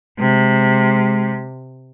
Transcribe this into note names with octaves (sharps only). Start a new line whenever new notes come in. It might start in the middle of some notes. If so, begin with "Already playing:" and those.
C3 G#3